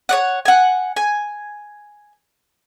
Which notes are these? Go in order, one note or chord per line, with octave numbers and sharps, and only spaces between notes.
C#5 D5 F#5
F#5 G#5
G#5